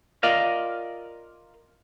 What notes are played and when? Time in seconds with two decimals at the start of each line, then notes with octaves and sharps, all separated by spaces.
0.23 F4 A#4 D5 D#5 F5